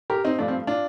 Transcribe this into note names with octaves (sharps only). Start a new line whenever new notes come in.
G4 A#4
C4 D#4
G2 F3 A3 D4
C4
D4 F4